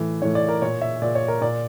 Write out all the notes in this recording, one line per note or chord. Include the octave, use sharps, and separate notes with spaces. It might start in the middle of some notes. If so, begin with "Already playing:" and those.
Already playing: A2 E3
A2 E3 C#5
D5
A#4
A#2 C#5
E5
A#2 D5
C#5
A#4
A#2 D5